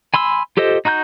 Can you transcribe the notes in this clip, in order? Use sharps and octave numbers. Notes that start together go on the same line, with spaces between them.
G#5 B5 C6 E6
F4 G4 A4 C5 D#5
D#4 F#4 A#5 F#6 G6